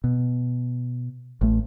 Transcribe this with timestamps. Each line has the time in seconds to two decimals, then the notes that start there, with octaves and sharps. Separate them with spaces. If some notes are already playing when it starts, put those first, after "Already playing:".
0.04 B2
1.41 A1 A3